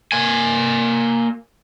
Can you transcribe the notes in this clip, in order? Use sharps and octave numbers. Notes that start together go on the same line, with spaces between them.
A#3 G#5